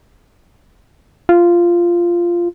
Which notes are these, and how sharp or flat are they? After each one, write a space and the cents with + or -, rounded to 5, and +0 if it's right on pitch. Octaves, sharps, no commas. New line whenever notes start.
F4 -10